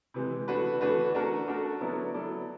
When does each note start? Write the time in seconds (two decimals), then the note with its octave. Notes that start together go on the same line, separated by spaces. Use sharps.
0.14 C3 E3 G#3
0.48 E3 A3 D4 F#4 B4
0.81 E3 A3 D4 F#4 B4
1.15 A3 D4 F#4 A#4
1.47 A3 D4 F#4 A#4
1.81 F#3 B3 E4 A4 D5
2.14 F#3 B3 E4 A4 D5